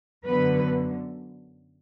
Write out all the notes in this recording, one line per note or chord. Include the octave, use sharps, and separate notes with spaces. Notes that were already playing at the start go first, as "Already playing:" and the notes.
F#2 D3 B3 B4